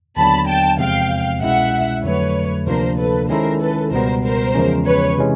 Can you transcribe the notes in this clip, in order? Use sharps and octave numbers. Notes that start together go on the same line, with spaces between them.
D#2 D3 F#3 B3 D4 A5 B5
G5 A5
E2 C3 F3 G#3 C4 F5 G5
C2 B2 G#3 C#4 E4 E5 F#5
F2 D3 F#3 A3 B4 C#5
D2 C3 F3 A#3 D4 A#4 C5
A4 B4
D#3 G#3 C#4 E4 A4 A#4 C5
A4 B4
C#2 B2 G3 B3 A#4 C5
A#4 C5
E2 C#3 F3 G#3 C#4
B4 C#5
C3 E3 G#3 C#4